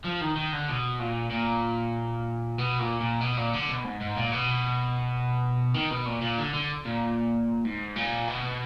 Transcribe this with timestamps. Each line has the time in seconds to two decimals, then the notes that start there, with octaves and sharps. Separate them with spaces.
0.04 F3
0.21 D#3
0.36 D#3
0.52 D3
0.68 B2
0.99 A#2
1.31 A#2
2.58 B2
2.79 A#2
3.00 A#2
3.21 B2
3.37 A#2
3.53 D3
3.68 B2
3.84 G#2
4.01 G#2
4.17 A#2
4.32 B2
5.74 D#3
5.91 B2
6.05 A#2
6.21 A#2
6.38 D3
6.54 D3
6.85 A#2
7.65 G#2
7.96 A#2
8.28 B2